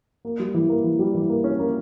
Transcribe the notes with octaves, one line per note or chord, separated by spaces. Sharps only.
A#3
G3
E3
A#3
E3
G3
E3
A#3
C#4
A#3